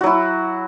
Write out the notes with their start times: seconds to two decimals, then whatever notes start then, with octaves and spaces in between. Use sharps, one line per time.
0.01 F#4
0.04 F#3
0.06 E4